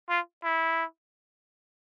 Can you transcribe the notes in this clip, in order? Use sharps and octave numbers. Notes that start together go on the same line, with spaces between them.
F4
E4